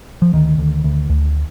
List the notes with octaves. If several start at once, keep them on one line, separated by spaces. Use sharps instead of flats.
F3
D2 D#3
D2
D2
D2